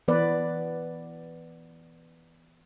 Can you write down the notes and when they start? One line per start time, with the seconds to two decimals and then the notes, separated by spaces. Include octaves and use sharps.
0.08 E3 B3 B4 D5